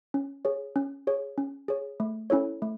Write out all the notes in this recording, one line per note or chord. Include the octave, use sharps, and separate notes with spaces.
C#4
G#4 C#5
C#4
G#4 C#5
C#4
G#4 C#5
A3
C#4 E4 A4 C#5
A3